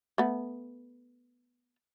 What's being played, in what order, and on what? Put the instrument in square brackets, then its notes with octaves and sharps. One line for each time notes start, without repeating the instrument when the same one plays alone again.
[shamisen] A3 B3